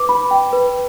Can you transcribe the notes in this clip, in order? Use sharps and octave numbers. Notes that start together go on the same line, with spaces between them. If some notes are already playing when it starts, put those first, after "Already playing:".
Already playing: B4 D6
B5
G5
B4